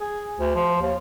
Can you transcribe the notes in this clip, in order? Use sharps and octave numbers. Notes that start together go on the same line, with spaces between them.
G#4
D2
F3
D#2